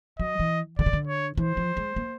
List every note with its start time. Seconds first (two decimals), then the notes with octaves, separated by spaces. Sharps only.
0.19 F#3 D#5
0.40 E3
0.79 D3 D5
0.86 C#3
0.93 D3
1.08 C#5
1.37 E3 C5
1.57 F3
1.77 G#3
1.96 A#3